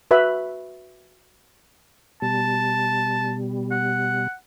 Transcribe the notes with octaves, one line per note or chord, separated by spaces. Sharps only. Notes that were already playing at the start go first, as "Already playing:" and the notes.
F#4 B4 E5 B5
B2 G3 A5
F#5